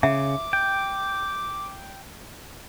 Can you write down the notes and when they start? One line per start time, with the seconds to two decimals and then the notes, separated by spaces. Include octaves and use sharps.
0.03 C#3 E5 D6
0.53 G5